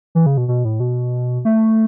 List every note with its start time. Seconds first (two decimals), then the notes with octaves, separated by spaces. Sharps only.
0.15 E3
0.26 C#3
0.37 B2
0.48 B2
0.65 A2
0.80 B2
1.45 A3